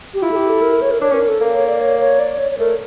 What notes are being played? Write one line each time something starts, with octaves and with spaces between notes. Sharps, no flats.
G4
E4 F4
A4
G4
A4
A#4
C#5
A#4
D4 C#5
C#4
A#4
A4
A#3
C#5
D5
C#5
C#5
D5
C#5
C#5
A3 A#4